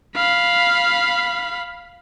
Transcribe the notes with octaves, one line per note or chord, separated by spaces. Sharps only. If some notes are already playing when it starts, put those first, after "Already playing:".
F5 B5